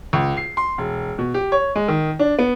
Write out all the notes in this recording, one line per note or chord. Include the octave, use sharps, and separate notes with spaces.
C#2
C7
C6
E1
B2
G4
C#5
G#3
D#3
D4
B3